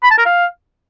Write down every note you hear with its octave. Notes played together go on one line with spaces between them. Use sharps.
B5
A5
A#4
F5